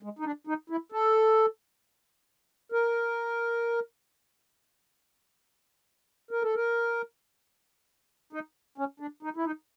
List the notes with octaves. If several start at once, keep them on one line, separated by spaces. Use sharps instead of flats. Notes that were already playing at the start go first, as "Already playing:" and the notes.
G#3
D#4
D4
D#4
E4
A4
A#4
A#4
A4
A#4
D#4
C#4
D4
D#4
E4
D#4